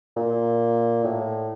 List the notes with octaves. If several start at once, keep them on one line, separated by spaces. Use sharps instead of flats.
A#2
A2